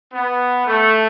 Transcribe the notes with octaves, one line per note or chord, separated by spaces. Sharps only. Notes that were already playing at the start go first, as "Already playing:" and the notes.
B3
A3